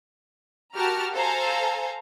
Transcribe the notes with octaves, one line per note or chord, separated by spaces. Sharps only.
F#4 G4 A#4 A5 A#5 F6
A4 C5 F5 G#5 A#5